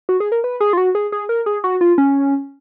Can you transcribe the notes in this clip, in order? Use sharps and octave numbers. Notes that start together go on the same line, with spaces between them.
F#4
G#4
A#4
B4
G#4
F4
F#4
G#4
G#4
A#4
G#4
F#4
F4
C#4